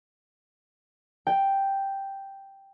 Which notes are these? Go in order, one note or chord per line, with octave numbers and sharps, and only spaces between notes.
G5